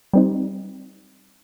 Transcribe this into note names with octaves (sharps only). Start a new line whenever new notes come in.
G3 C4 D#4